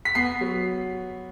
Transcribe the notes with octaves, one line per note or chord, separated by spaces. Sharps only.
B6
B3 C7
F#3